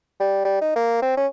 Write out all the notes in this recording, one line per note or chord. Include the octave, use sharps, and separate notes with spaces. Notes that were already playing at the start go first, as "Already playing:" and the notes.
G3
G3
D#4
A#3
C4
C#4